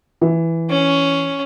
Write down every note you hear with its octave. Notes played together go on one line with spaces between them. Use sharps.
E3
C#4